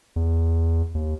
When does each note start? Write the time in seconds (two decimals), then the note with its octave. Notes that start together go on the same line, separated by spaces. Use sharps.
0.16 E2
0.95 D#2